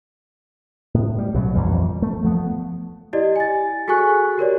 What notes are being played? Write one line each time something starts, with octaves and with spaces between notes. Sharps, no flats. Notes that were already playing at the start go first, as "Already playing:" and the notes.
A2
G3
C2 B2 F#3
A#1 F2 E3 G3
A3
F3 A3 B3
E4 G4 D5 D#5
G#5 A6
F#4 G#4 A4 G#5 C#6 F#6
G4 A#4 C#5 D5